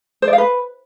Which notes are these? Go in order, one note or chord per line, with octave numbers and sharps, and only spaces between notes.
C5
D5
F5
B4